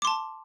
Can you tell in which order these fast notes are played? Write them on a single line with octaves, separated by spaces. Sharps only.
D6 C6 A5